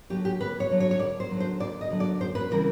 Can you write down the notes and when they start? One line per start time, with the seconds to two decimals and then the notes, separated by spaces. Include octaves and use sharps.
0.10 D3 F#3 G4
0.25 G4
0.40 D2 B4
0.60 C#5
0.71 D3 F#3
0.80 C#5
0.91 C#5
0.99 D2 D5
1.20 C5
1.31 D3 F#3
1.40 C5
1.60 D2 D5
1.81 D#5
1.90 D3 F#3
2.00 D5
2.21 F#2 C5
2.35 B4
2.51 C#3 E3 G3 C4 A#4